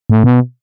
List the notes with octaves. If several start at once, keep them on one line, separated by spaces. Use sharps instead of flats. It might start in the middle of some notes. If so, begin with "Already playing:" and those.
A2
B2